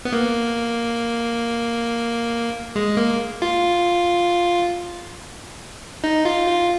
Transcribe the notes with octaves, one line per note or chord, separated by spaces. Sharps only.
B3
A#3
G#3
A#3
F4
D#4
F4
F4